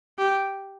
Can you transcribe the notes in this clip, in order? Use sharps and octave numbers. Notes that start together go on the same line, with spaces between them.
G4